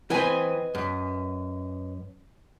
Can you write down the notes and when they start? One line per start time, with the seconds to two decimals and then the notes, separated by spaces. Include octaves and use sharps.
0.10 E3 C4 B4 D#5 G#5
0.75 F#2